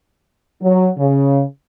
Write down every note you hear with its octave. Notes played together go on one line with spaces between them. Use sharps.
F#3
C#3